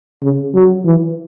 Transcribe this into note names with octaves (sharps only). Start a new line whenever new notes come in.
C#3
F#3
E3